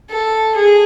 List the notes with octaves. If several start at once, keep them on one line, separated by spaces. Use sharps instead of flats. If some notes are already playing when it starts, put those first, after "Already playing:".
A4
G#4